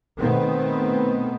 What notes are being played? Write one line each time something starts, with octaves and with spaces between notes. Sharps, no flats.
B2 D#3 A3 B3 C4